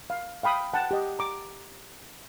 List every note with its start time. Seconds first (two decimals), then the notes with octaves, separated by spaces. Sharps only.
0.10 F5
0.43 F5 G5 B5 D#6
0.74 F#5 G5 A5
0.91 G4 D#5
1.19 A#5 D6